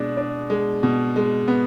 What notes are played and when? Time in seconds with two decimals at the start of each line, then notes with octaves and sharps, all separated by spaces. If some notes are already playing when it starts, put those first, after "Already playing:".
Already playing: B2 G#3 D4
0.17 D4
0.50 G#3
0.83 B2
1.16 G#3
1.48 B3